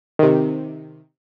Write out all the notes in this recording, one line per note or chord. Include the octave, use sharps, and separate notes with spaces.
C3 D#3